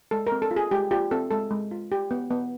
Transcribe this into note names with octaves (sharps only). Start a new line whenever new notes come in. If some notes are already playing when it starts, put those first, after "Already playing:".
G#3 A4
A#4
C4
A4
F4
G#4
G#3 G4
F4 G4
C4 A4
G#3 A4
G#3
F4
G4
B3
B3